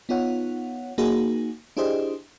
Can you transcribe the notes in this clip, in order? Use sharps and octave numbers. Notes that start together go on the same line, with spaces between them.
B3 D#4 F4 C#5 F#5
A#3 D#4 F#4 G#4
D4 E4 G4 G#4 C5 D#5